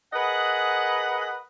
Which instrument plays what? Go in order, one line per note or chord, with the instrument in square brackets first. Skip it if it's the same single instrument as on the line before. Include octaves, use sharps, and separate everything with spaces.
[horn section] G#4 A#4 B4 D#5 F#5